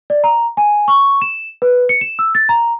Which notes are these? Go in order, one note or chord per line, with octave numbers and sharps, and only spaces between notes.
D5
A#5
G#5
C#6
E7
B4
C#7
E7
E6
A6
A#5